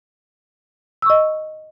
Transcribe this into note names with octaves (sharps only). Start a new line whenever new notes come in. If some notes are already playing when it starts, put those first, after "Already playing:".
D#5 C#6 E6